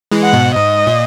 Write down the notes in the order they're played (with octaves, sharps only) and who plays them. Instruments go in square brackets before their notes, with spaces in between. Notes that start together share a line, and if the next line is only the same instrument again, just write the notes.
[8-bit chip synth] E3 G#3
[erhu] F#5
[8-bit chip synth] G#2 B2
[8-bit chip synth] G#2 [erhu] D#5
[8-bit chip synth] A#2